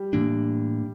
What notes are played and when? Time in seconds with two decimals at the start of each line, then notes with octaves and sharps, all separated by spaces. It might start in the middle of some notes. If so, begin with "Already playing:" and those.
Already playing: G3
0.13 A2 E3 A#3 D4